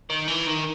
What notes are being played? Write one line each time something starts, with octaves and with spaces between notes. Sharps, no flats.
D#3
E3
D#3